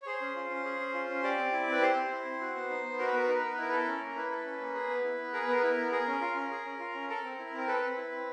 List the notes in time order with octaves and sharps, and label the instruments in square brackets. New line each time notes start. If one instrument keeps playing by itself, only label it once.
[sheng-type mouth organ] C#5
G#4 C5
C#4
F4
C#4
G#4
C#4
F4
C#4
G4 D5
C4
E4
C4 B4
G4 C5
C4
E4
C4
F#4
B3
D#4
B3
F#4 A#4
B4
B3 A#4
B4
D#4 A#4
B4
B3 A#4
B4
E4 A#4
B4
A4 A#4
C#4
A#3
E4 B4
A4
C#4
A#3
G#4
B3
E4
B3
G#4 A#4
B4
B3 A#4
E4 B4
A#4
B3
G#4 A#4
C#4
F4
C#4
G#4
C#4
F4
C#4
A4 A#4
C4
E4
C4 A#4
A4 B4
C4
E4
C4